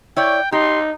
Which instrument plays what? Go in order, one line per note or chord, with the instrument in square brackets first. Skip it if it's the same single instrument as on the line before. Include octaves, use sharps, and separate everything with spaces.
[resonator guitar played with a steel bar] E4 C#5 D5 [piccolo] G5
[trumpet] D#4 [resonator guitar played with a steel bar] G4 [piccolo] C6